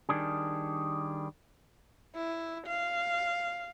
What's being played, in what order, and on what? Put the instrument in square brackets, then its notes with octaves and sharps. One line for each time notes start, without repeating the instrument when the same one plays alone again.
[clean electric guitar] D#3 G3 D4 G#4
[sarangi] E4
F5